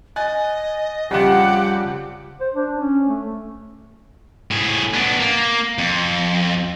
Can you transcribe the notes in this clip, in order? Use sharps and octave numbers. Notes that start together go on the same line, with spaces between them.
D#5 G#5 F#6 A6
F2 C#3 G3 F4 G4 F#5
C5
D4
C#4
A3
A2 G#4
B3 D4
A#3
F2